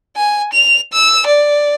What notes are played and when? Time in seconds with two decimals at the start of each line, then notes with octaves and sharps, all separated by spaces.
0.16 G#5
0.53 F7
0.93 E6
1.26 D5